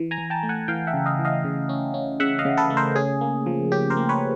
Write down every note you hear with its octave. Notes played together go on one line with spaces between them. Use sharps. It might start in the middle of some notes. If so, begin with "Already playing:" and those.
Already playing: E3
G#5 A#5
E3
G5 A5
A3
F#5 G#5
E3 F5 G5
E5 F#5
C#3
D#5 F5
E3
D#5 F5
C#3
C#4
C#4
C#3 E5 F#5
D#5 F5
C#3
A4 B4
A3
A#4 C5
C#4 G#4
A#3
F3
C#4 G4
A#4 C5
A#3
B4 C#5